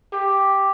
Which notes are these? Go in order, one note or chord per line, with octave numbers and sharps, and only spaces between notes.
G4